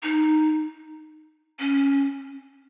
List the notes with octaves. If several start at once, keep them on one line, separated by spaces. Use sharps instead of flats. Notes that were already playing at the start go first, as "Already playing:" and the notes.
D#4
C#4